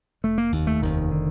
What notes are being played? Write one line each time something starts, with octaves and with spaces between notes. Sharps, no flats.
F1 A3
A#3
D#2
A3
F1 D#3
D3